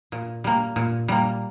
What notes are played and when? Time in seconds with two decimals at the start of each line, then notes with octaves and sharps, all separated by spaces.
0.12 A#2
0.44 G3 A#3
0.76 A#2
1.08 G3 A#3